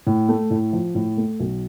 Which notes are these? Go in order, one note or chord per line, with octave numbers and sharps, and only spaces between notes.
A2
A3
A2
F3
A2
A3
B1